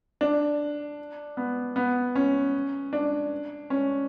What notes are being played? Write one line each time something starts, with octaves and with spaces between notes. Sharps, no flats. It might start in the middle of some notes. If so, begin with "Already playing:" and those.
D4
B3
B3
C#4
D4
C#4